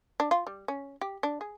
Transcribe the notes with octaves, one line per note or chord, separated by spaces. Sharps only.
D4
F4
G3
C#4
G4
D4
G#4